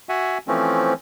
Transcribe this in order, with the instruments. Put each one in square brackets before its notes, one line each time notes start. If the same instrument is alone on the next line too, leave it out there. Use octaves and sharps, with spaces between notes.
[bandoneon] F#4 E5 F#5 G#5
E3 F3 A3 C4 C#4